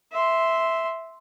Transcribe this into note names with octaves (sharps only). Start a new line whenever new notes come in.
E5 C6